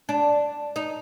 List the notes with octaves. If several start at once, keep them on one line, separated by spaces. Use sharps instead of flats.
D4
D#4